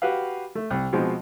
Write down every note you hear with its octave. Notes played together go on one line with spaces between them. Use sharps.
F#4 G4 B4 F5
A3
C2
B2 F3 G#3 C4